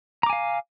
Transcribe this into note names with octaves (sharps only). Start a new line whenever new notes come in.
F5 G#5 A#5 D6